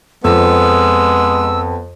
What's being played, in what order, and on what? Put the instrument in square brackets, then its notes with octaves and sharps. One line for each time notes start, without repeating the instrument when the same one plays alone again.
[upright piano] F2 [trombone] G#3 [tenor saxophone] B3 [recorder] E6